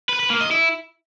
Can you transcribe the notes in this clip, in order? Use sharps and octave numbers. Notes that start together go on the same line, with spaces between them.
B4
B4
A#3
D#5
E4